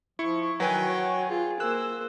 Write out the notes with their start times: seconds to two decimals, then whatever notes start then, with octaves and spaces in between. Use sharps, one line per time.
0.19 F3 E4 C#6
0.60 D#3 F#3 F#4 B4 G5 G#5
0.89 C#5
1.29 F4 G#4
1.60 A#3 C5 E6 F#6